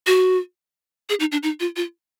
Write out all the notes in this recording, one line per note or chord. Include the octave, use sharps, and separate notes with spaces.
F#4
G#4
D#4
D4
D#4
F4
F4